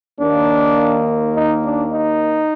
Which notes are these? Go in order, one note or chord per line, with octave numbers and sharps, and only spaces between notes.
D#2 D#3 A#3 D4
D#4
D4
D#4